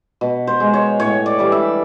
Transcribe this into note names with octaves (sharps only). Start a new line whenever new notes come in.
B2
C5
G#3
C#5
A2 C#5
D5
E3 G3
E5